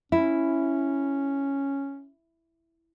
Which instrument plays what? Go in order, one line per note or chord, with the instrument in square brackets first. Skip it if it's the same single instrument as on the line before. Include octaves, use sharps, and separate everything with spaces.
[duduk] C#4 [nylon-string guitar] E4